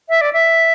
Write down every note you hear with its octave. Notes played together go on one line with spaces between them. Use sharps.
E5
D5
E5